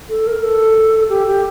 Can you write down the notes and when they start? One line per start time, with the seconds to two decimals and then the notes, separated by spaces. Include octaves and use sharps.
0.09 A4
0.27 A#4
0.43 A4
1.09 G4
1.27 G4